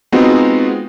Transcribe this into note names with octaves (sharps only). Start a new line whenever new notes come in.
G#3 B3 C4 D#4 F4 F#4